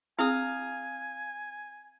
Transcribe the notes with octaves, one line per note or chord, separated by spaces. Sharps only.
C4 E4 G#4 F5 G#5 D#6